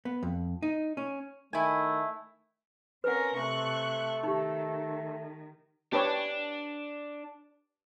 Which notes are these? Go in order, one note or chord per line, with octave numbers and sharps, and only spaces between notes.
B3
F2
D#4
C#4
D#3 A3 E4 G#5
C4 C#4 A#4 B4 F#5
C3 A3 C#6 F#6
D#3 D#4 G4
D4 G4 B4 C#5